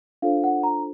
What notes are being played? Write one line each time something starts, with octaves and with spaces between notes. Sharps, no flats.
D4 F4 A4 C5 F5
F#5
A#5